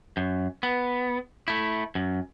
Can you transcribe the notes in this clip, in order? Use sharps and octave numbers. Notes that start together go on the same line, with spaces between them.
F#2
B3
A3 E4
F#2